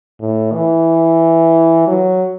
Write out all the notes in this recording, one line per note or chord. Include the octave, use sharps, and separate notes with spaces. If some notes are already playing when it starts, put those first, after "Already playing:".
A2
E3
F#3